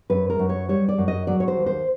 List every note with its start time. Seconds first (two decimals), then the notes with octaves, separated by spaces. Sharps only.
0.10 F#2 B4
0.30 A#4
0.39 F#2
0.49 C#5
0.69 G3 C#5
0.89 D5
0.98 F#2
1.08 D#5
1.27 F#3 D5
1.40 C#5
1.48 C5
1.57 D#2
1.66 C5